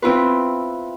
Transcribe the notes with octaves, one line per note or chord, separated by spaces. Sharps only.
C4 E4 F4 B4